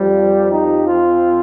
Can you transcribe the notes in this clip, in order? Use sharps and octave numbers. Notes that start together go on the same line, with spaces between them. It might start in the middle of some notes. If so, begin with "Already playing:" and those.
Already playing: F2 F3 G3
D#4 G4
C4 F4